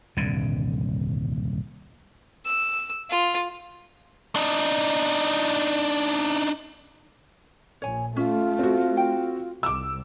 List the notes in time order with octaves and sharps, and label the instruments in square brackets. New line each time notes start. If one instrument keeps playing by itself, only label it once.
[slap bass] D#1 C2 G2 D3
[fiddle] E6
F4
[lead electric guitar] D4 D#4
[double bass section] A#1 [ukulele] C#5 G#5
[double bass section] A3 [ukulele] C#4 [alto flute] F4
[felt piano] C4 F#4
[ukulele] G5
[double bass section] C2 [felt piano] D6 E6